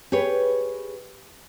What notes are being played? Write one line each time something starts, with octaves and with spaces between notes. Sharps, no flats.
G4 G#4 B4 C#5